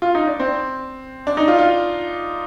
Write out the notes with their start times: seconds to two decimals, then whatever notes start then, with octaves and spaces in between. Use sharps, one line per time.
0.02 F4
0.15 D#4
0.27 D4
0.39 C4
1.27 D4
1.37 D#4
1.48 F4
1.59 F4